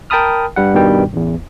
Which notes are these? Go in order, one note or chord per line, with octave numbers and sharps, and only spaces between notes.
A#4 G5 A5 B5 D#6 F6
G2 G3 F#5
G2 B2 D#3 G3 G5
A1 E2